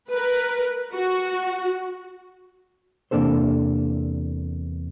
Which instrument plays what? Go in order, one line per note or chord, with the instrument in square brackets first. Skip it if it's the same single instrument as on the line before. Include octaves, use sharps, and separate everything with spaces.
[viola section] A#4 B4
F#4
[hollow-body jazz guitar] E2 C3 A#3 D4 A4 C5